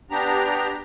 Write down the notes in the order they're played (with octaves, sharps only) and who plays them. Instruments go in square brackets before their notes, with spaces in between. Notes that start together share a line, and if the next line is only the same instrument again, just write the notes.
[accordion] B3 D4 G4 A#5